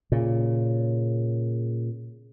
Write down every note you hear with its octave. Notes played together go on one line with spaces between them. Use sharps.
A#2 C#3